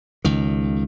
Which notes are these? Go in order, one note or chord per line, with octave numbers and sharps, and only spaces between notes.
C#2 D#3